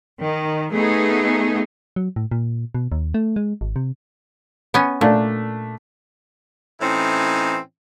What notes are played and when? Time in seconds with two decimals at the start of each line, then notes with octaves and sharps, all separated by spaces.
0.21 D#3
0.72 A3 B3 D#4 G#4
1.96 F#3
2.16 A2
2.31 A#2
2.75 B2
2.92 D#2
3.14 A3
3.36 G#3
3.61 G#1
3.76 C3
4.74 B3 C#4
5.01 A#2 A3 D4
6.81 A2 E3 C4 C#4 D#4